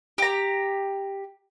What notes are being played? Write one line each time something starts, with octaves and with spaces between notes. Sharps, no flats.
G4 A#5